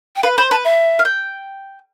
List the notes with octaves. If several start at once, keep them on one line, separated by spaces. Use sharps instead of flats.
G5
B4 F5
C5 B5
B4 A5
E5
F5
G5